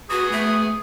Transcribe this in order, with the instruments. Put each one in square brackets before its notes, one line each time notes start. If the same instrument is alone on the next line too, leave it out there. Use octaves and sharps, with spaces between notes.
[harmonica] B3 G#4 D#6 [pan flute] F#4
[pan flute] A3